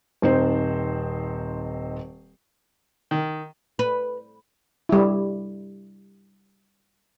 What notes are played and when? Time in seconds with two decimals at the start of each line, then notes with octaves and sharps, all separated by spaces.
0.22 D#1 C4 D#4 C5
3.11 D#3
3.79 B4
4.89 G3 E4